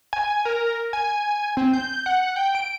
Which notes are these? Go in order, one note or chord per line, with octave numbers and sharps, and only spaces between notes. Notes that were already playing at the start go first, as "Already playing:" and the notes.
G#5
A#4
G#5
C4
G6
F#5
G5
D7